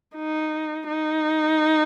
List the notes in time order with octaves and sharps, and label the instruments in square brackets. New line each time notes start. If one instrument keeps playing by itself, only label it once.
[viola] D#4
D#4